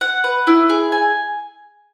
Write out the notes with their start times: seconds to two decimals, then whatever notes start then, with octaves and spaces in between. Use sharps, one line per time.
0.01 F#5
0.24 B4
0.47 E4
0.70 G#4
0.92 G#5